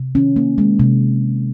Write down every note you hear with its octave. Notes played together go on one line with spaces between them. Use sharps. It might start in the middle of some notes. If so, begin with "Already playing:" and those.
Already playing: C3
D#3 C#4
A#3
G#3
C3